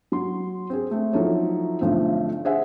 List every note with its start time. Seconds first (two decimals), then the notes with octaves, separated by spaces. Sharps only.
0.12 F#3 C6
0.70 C4 G#4
0.91 A3 C4
1.13 F3 F#3 D#4 E4 A4 C#5
1.81 B1 D3 F3 A3 C4
2.45 G#4 C5 E5 F#5 G#5